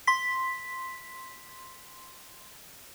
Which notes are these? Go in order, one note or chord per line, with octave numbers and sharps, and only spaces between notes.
C6 B6